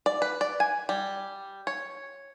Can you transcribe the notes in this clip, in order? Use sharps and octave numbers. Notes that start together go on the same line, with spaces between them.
D5
B4
D5
G#5
G3
C#5